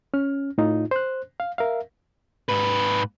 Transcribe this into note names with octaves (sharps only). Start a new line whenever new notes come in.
C#4 F6
A2 D#4 F4
C5 F#6
F5
A#4 E5 F5
G#2 B4